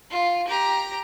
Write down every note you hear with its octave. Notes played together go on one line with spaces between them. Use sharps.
F4
G4 A#5